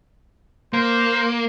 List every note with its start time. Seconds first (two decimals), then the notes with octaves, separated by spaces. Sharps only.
0.73 A#3 C5